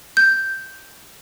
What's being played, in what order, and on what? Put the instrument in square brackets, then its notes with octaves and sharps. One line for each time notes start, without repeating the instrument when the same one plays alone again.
[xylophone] G6